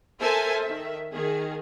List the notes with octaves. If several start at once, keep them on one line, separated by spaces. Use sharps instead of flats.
A4 A#4 C5 E5 G#5 A5
D#3 E5
D#3 G#4